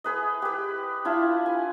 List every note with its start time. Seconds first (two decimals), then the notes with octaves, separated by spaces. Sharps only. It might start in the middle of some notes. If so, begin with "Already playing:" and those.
0.04 G#4 B4 D#5
0.42 G4 B4
1.05 D4 E4 F4
1.46 G#5